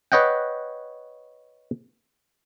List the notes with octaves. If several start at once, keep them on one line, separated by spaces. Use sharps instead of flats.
B4 C#5 D#5 F#5 G5